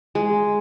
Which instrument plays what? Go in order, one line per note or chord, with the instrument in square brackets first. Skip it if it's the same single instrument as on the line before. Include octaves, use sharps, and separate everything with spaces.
[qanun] G#3